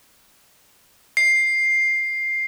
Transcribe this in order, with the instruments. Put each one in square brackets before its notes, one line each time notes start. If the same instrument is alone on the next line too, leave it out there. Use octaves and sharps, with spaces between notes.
[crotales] C7